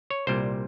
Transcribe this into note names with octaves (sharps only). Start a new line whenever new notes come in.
C#5
C2 A#2 G3 C5